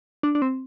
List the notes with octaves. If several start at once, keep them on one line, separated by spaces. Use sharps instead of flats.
D4
D4
C4